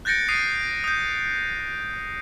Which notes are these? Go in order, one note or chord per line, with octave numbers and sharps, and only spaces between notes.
F#6 G6 A6 A#6 C#7 D7
D#6 C7 D7 D#7
D#6 G6